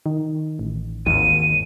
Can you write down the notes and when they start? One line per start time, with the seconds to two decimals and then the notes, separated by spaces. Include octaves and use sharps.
0.06 D#3
0.59 A1
1.06 G#1 D#2 D#7